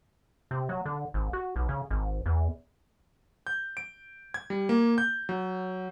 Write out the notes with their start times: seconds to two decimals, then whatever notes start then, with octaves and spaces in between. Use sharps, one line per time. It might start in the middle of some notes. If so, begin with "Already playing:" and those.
0.51 C3
0.69 F#3
0.86 D3
1.14 G#1
1.33 F#4
1.56 B1
1.69 C#3
1.91 G#1
2.26 E2
3.47 G6
3.77 D7
4.34 G#6
4.50 G3
4.69 A#3
4.98 G6
5.29 F#3